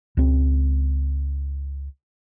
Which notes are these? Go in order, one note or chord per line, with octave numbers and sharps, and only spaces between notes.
C#2 C4